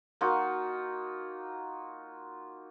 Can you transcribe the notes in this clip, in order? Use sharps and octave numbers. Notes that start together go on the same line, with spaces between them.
A#3 D#4 F4 F#4